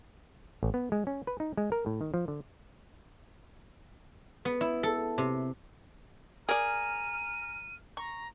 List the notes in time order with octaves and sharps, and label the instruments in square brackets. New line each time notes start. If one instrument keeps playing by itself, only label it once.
[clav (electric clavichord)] A1
B3
G#3
C#4
B4
D#4
G#3
A#4
A2
D#3
F3
D3
[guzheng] B3
E4
A4
C3
[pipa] G#4 [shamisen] A#4 D5 [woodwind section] A#5 F6 [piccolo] D#7
[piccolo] A#5 [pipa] C#6